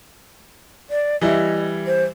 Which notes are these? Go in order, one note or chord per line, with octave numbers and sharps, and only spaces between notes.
D5
E3 G3 E4 D#5
C5